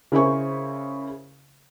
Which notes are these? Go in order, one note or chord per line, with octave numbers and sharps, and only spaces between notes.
C#3 E4 A#4 C5 G#5 C#6